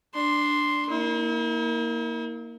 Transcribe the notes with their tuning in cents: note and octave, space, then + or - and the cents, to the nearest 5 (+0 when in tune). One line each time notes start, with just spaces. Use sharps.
D4 +0 C6 +0
A#3 +0 E4 -45